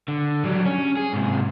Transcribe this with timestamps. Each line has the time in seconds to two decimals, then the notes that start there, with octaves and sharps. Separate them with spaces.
0.08 D3
0.45 F#3 G3
0.66 C#4
0.97 G#4
1.13 G#2 C3